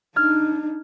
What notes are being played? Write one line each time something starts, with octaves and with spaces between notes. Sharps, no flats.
D4 D#4 F6 G#6